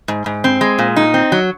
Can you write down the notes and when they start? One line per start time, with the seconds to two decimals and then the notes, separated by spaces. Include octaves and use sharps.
0.08 G#2
0.26 G#2
0.44 C4
0.61 G#3
0.79 A#2
0.96 D#4
1.14 C4
1.32 F#3